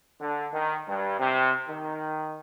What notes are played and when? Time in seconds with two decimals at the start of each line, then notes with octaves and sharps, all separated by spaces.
0.19 D3
0.53 D#3
0.87 G2
1.19 C3
1.68 D#3